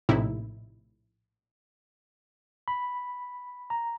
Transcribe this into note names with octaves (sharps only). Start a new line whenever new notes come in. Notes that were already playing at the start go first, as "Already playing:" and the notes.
A#1 A2 C3 D#4 E4
B5
A#5